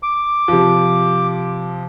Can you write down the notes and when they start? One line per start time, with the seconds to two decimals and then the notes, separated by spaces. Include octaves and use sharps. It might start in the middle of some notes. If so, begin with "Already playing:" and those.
0.03 D6
0.48 C3 F3